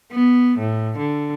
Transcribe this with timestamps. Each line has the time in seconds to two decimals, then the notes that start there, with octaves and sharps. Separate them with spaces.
0.12 B3
0.59 A2
0.98 D3